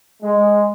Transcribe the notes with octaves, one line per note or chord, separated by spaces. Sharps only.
G#3